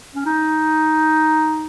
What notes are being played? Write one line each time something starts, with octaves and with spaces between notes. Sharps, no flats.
C#4
D#4